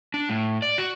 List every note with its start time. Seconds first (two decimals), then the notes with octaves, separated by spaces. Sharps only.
0.14 D4
0.29 A2
0.62 D5
0.78 F#4